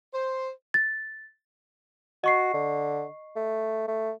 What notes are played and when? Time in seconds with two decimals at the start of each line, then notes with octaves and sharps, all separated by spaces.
0.14 C5
0.74 A6
2.24 F#4 D#5 C#6 C7
2.54 D3
3.36 A3
3.88 A3